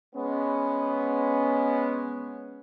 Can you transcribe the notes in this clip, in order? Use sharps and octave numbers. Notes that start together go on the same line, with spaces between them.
G#3 B3 C#4